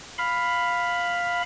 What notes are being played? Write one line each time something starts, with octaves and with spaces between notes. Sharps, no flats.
F5 B5